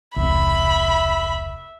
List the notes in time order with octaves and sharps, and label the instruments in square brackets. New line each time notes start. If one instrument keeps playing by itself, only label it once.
[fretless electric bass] E1 C2 [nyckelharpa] E5 [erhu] B5